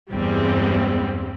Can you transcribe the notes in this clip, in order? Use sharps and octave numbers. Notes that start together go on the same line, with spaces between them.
E2 G2 G3 G#3 A#3 C4